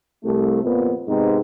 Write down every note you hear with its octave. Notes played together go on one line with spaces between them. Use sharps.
C2 A3
F2 A#2 F3 B3
G#2 C3 G#3 B3 C4 D#4